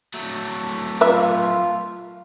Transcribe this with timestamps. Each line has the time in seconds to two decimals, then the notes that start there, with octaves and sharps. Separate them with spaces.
0.14 F#3 A3
1.01 F4 B4 E5